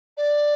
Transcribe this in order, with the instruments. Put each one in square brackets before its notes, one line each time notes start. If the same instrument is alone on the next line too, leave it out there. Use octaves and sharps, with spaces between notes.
[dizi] D5